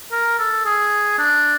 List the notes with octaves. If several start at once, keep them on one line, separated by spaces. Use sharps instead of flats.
A#4
A4
G#4
D4